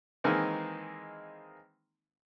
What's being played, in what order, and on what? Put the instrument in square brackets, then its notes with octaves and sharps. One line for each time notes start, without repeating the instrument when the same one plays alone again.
[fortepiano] D#3 E3 G#3 A#3 C4 D#4